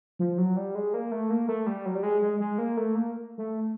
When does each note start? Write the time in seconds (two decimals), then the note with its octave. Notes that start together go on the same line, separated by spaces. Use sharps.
0.19 F3
0.38 F#3
0.57 G3
0.75 G#3
0.94 A#3
1.12 A3
1.30 A#3
1.48 A3
1.66 G3
1.86 F#3
1.95 G3
2.03 G#3
2.22 G#3
2.40 G#3
2.58 A#3
2.77 A3
2.95 A#3
3.38 A3